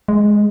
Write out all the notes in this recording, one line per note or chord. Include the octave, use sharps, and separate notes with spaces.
G#3